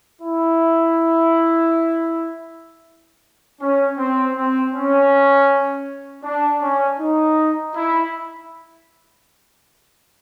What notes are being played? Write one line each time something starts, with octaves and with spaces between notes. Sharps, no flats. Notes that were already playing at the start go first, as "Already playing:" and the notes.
E4
C#4
C4
C4
C#4
D4
C#4
D#4
E4